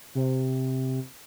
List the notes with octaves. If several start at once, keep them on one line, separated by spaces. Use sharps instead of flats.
C3